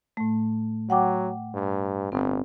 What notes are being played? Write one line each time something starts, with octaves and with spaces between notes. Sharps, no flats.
A2 A3
F#3 F#5 G5 D6
G2
G1 C4